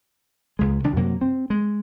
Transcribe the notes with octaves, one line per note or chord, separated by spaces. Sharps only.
C#2 G#3
C2 D#3 D4
F#2 C3 F#3 A#3
C4
G#3